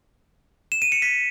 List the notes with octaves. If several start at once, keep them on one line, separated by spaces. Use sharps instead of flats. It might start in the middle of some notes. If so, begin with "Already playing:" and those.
E7
D#7
C#7
B6